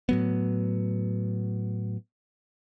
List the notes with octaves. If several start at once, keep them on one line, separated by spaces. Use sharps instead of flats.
A2 F#3 B3